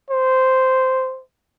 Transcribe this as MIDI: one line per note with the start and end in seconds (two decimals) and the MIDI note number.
0.10 1.22 72